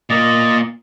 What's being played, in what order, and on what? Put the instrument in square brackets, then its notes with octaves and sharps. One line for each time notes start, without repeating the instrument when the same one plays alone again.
[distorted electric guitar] A#2 A#3 [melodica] D5 D#5